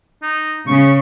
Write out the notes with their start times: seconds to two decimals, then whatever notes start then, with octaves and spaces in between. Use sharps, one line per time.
0.22 D#4
0.67 C#3 C#6